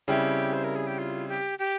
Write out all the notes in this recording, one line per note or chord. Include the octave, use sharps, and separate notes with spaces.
C#3 G3 C4 E4 G4
C5
A#4
G#4
G4
F4
G4
G4